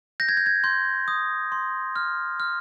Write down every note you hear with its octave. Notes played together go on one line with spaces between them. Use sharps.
G6 A#6
G#6
G6
G#6
C6 G6
D#6
C6
F6
F6